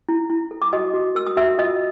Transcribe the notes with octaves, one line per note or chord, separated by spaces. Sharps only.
E4
E4
A4
D6
F#4 D#5 D#6
F#4
A#4 E6
D#6
F#4 E5 E6
F4 D#5 D#6